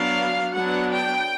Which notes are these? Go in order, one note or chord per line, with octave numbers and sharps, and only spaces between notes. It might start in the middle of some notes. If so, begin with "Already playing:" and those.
Already playing: F#3 B3 D4 F5
F#3 B3 D4 F#5
G5